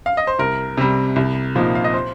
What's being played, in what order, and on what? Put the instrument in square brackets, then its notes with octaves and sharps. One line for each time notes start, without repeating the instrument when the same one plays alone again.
[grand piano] F5
D#5
C5
C2 A#4
C3 G3
C2
A#2 F3 A#3 D#4
F5
D#5
C5